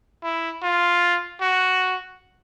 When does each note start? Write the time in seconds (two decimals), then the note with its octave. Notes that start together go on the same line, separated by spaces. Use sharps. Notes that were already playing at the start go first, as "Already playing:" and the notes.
0.23 E4
0.62 F4
1.41 F#4